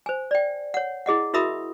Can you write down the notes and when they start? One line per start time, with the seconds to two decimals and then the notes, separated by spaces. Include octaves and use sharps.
0.06 C5 G#5
0.31 D5 G5
0.74 C#5 F#5
1.06 E4 G#4 D#5 F#5
1.34 E4 F#4 A#4 E5 B5 D#6